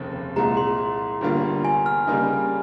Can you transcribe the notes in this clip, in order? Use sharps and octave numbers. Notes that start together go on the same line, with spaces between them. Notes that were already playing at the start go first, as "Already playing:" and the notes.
Already playing: F1 D#2 C#3 C4
C2 A#2 G#3 A#5
C6
G1 G2 G3 A#3 F4
G#5
F6
C#3 G3 A#3 D#4